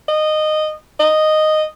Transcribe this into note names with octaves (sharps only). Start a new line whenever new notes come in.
D#5
D#5